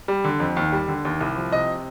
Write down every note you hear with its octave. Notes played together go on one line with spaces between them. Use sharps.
G3
D3
F2
D#2
G3
D3
D#2
C2
F3
C3 D#5